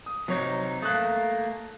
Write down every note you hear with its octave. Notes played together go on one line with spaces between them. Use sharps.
D#6
C3 F#3 D#4 C#5
A3 A#3 D#6 F#6